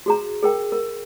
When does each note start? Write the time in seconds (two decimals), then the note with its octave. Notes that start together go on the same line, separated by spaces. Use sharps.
0.06 F#4 G#4 A#5
0.43 G#4 A#4 G5
0.72 A#4